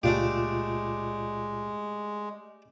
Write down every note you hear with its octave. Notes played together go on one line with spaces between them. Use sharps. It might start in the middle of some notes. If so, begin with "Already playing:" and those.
C#2 A#2 G#3 A3 D4 F4 G4